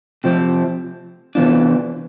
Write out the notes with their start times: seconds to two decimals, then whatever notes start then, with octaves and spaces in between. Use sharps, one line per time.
0.24 C3 F3 C4
1.35 C3 E3 B3 D4 F4